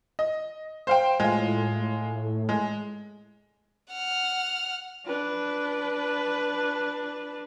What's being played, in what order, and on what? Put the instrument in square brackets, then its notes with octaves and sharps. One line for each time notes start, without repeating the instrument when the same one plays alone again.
[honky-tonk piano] D#5
C5 F5 G5
[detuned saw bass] A2 [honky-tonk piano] G#3 F4
[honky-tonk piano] G#3
[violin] F#5 F6
[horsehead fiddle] D4 B4